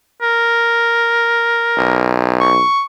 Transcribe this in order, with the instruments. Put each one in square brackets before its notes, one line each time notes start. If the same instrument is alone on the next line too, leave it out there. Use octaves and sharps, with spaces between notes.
[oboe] A#4
[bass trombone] B1
[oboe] C#6